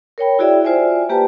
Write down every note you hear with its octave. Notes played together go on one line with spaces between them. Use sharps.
A#4 C#5 G5 B5
E4 F#4 G#4 D5 E5 G5
F4 C5 D5 E5 G#5
A#3 G4 B4 G5 A5